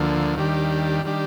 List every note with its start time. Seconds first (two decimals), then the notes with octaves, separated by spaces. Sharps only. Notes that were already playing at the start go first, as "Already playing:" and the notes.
Already playing: D2 D3 F3 A#3
0.36 D#2 D#3 G3 D4 G4
1.05 D#3 G3 D4 G4